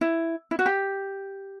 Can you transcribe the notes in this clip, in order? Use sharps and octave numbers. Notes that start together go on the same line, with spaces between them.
E4
E4
F#4
G4